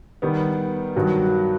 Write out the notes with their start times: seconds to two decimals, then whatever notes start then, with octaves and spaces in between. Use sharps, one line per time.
0.22 D#3 G3 B3
0.96 G2 D#3 F#3